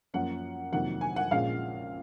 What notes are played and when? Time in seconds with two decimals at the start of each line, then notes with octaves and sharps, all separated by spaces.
0.14 F#2 F3 A#3 C#4 F#5
0.72 F2 C3 D#3 F#3 A#3 F#5
1.01 G#5
1.16 F#5
1.31 A#1 A#2 G#3 C#4 F5